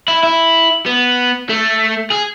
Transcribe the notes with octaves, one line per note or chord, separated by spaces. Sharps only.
E4
E4
B3
A3
G#4